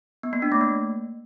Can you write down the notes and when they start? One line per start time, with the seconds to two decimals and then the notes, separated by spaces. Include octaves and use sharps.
0.23 B3
0.33 A#3
0.42 D4
0.52 A3
0.61 A#3